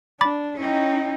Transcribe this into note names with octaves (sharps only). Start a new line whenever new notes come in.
D4 B5 D6 A6
C#4 D#4 E4 G5